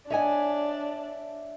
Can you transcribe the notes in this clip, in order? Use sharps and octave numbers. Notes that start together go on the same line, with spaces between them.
D4 C#5 D#5 E5 G#5